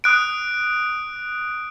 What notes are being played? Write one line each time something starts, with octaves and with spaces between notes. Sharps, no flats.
D#6 F#6 D7